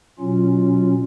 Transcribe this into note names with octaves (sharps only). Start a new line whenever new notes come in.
B2 F#3 C#4 F4